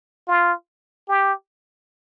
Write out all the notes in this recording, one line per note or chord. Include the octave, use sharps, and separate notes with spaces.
F4
G4